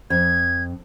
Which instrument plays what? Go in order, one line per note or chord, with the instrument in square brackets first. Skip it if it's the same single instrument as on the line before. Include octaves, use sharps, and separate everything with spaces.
[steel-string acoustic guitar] F2 [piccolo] G#6